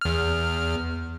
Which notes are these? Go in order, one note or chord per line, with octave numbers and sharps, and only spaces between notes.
E2 F6